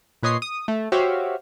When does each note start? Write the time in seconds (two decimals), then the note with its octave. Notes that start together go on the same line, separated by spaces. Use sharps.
0.23 A#2 B4 C#5 D#5 C6 C7
0.42 D#6
0.68 A3
0.92 F#4 G4 C5 C#5 E5 F5